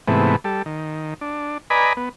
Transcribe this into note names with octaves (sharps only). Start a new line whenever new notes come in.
G#2 C3 E3 A3 B3
G3 A4
D#3
D4
B4 D5 D#5 G#5 A#5 B5
B3